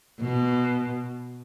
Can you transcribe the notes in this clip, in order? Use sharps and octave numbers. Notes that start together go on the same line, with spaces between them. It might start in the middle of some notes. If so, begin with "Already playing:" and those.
B2